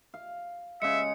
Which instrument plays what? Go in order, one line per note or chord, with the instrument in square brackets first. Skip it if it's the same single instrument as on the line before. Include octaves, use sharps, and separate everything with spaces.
[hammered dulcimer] F5
[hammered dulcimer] C#3 G#3 [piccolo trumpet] E5 [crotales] C#7